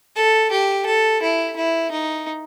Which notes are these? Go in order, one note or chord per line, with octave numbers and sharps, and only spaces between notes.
A4
G4
A4
E4
E4
D#4